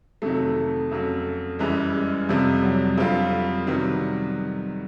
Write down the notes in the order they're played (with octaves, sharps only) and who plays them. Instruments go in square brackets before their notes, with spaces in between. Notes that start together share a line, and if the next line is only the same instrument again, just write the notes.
[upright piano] F2 C3 D#3 F#3 [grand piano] A3
[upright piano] F2 C#3 F#3
[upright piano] F#2 C#3 E3 G#3 [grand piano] G3
[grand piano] G#3
[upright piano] F2 C3 F3 [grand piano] G3
[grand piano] F#3
[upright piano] F2 D3 G3 C4 F4
[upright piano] C3 D#3 F#3 B3 [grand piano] G3